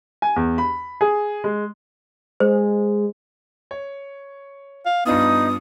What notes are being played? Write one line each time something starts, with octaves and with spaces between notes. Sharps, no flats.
G#5
E2
B5
G#4
G#3
G#3 C5
C#5
F5
G2 B3 D4 D#4 F4 D#6